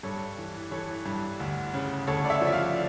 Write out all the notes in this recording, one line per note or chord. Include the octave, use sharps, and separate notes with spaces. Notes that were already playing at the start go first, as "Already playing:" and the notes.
G2 A4 C#5
E3
E3 A4 C#5
G2
D2
C#3
D2 A4 C#5
D5
C#5 E5
F3
E5
D5 F5